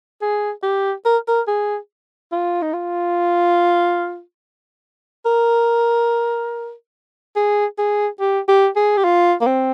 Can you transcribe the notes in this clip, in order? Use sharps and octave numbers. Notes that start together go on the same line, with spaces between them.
G#4
G4
A#4
A#4
G#4
F4
D#4
F4
A#4
G#4
G#4
G4
G4
G#4
G4
F4
A#3
C4